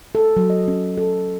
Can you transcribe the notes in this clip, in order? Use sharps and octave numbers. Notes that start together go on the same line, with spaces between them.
A4
F#3
D#5
C#4
A4